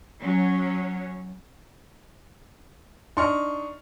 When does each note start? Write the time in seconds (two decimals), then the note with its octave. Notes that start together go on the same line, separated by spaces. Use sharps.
0.20 F#3 C#4 C#5
3.17 D4 D#4 D#5 C6 C#6 F6